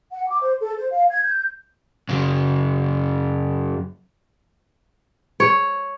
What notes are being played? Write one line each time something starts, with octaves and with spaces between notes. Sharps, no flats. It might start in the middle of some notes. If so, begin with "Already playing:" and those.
F#5
D6
C5
A4
C5
F5
G#6
G6
F#2 C#3
C#5